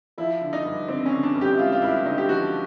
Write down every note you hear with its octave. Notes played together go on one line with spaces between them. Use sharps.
F3 E4
D3
D#4
G2
D3 C4
C#4
D3
D4
G2
G4
E4
G#3 F4
F4
G2 E4
D3 D#4
G4
F3 F#4